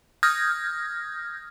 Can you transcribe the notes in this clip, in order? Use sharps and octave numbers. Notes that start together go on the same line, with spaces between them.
D#6 F6 G6 G#6 A#6